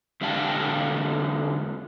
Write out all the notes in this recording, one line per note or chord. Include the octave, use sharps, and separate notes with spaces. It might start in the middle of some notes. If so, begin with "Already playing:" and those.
E2 D3 G#3 F5 G5 A5